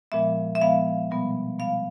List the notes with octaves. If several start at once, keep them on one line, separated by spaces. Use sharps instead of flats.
A#2 F3 G#3 B3 E5
E5
A#2 F3 G#3 B3 F5
B2 G3 B3
B2 G3 B3 F5